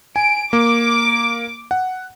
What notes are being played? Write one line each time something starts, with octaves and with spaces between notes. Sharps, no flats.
G#5 D7
A#3 D6
F#5